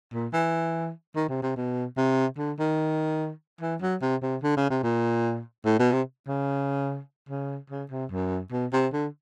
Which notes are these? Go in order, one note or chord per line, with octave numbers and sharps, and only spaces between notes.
A#2
E3
D#3
C3
C3
B2
C3
D3
D#3
E3
F#3
C3
C3
D3
C#3
C3
A#2
A2
B2
C3
C#3
C#3
C#3
C3
F#2
B2
C3
D3